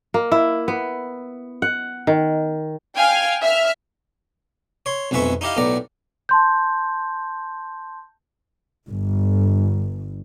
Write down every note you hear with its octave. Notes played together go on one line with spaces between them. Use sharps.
A#3
E4
B3
F#5
D#3
F5 G5 G#5 F6
E5 F6
C#5 C6
B1 F2 G#3 B4 E5 C#6
D#4 E4 G4 D#5 F5
B1 A2 B3 D5 A#5
A5 C6 G6
G1